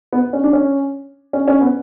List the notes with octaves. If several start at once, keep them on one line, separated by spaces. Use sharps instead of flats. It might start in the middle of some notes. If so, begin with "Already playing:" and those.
B3
C#4
D4
C#4
C#4
C#4
B3